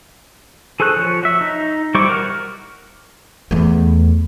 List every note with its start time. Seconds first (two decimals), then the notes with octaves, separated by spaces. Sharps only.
0.80 G#4 A4 C5 C#6 F#6
0.96 F3 C#5
1.23 F#4 E5
1.41 D#4
1.95 G3 E4 C5 C#6 D6
2.09 F#4 A#4 F#5 F6
3.51 E2 A3